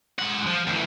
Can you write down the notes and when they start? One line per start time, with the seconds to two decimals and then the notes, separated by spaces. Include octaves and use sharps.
0.19 G#3 F#5
0.47 F3
0.67 D2 E3